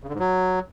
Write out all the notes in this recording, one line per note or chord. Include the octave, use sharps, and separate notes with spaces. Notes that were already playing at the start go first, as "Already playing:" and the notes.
C#3
D3
G#2
F#3